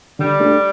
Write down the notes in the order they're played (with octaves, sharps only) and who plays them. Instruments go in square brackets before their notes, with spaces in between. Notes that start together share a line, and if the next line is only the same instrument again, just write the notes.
[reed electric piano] D3 [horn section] G3
[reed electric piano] A3 D4 G4